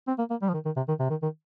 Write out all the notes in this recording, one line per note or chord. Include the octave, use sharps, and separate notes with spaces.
C4
A#3
A#3
G3
F3
D#3
D#3
C3
D#3
C3
D#3
D#3